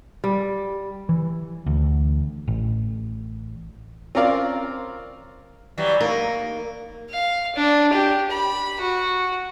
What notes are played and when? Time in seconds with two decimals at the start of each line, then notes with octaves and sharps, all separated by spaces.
0.24 G3
1.09 E3
1.67 D2
2.48 A1
4.15 C4 C#4 F4 A#4 D5 F5
5.78 E3 F#3 G3
6.01 A#3 D#4
7.10 F5
7.55 D4
7.92 G4
8.30 B5
8.80 F#4